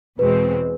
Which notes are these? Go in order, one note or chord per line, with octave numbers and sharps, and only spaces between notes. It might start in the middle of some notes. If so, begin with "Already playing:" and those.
E2 B2 G#3 C4 B4